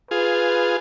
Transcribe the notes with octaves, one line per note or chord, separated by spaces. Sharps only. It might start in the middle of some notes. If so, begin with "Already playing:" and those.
F4 G#4 B4